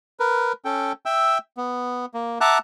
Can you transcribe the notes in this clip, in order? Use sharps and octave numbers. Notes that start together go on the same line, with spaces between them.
A#4 B4
C#4 A4 G5
E5 G5 E6
B3
A#3
E5 F#5 A5 A#5 D6 F#6